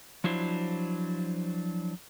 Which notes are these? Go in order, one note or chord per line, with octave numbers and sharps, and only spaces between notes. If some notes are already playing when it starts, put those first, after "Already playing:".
F3 F#3 D4 E4 C5